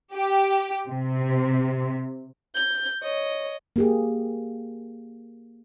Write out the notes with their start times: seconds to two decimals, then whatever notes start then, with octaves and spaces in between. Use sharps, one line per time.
0.14 G4
0.88 C3
2.55 G6
3.03 C#5 D#5
3.76 A#3 G4 G#4